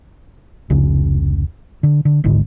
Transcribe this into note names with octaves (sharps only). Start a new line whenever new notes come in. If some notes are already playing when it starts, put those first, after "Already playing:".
F1 C#2 C#3
D3
D3
D1 G#1 G#2 D3